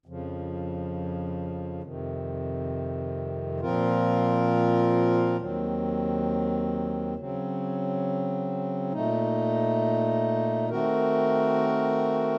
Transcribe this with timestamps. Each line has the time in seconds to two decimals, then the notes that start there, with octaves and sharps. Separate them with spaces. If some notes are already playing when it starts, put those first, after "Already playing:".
0.06 F2 C#3 F3
1.83 F2 C3 D#3
3.60 A#2 F3 C4 F4 A#4
5.38 D#2 D#3 F#3 C4
7.16 C#3 F#3 C4
8.92 A#2 A3 D#4
10.70 D#3 A3 C4 F#4 A#4